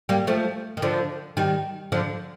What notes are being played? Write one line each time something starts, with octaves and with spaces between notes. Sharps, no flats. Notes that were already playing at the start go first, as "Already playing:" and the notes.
G3 A#3
F3 A3
D#3
D3 F3
D#3 G3
D3 F3